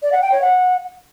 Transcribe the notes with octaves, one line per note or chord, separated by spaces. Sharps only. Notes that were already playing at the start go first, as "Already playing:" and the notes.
D5
F#5
G5
C#5
F#5